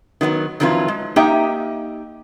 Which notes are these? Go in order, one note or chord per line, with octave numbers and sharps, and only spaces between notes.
D#3 F#3 A#3 B3
F2 D#3 F#3 E4 F4 B4
G#3
A#3 D#4 G4 D#5 E5 G5